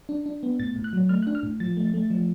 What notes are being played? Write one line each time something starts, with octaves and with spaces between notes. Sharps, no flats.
D4
D4
B3
A2 A6
A2
F#6
F#3
A3 F6
F#6
D4
F6
A2
F3 A6
A3
A3
F3